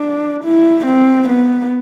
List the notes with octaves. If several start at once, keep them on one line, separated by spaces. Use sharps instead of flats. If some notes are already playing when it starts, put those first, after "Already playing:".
Already playing: D4
E4
C4
B3